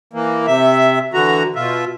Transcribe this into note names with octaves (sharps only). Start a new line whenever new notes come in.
E3 A#3
C3 E5
D3 E3 F#4 A#5
B2 F4 E5